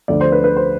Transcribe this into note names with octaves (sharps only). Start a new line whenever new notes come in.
D2 D3 F3 D5
C5
B4
B4
C5